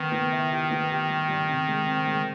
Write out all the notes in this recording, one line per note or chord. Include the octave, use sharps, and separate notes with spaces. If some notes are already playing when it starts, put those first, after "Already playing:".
Already playing: D#3 B3
B3
E4
G4
B3
G4
G3
G3
C3
G#3
C4
G#3